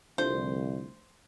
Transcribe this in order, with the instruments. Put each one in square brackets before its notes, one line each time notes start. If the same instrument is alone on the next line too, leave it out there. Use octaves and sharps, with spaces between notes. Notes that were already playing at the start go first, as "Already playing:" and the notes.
[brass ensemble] C2 [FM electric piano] D3 F3 A3 [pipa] C5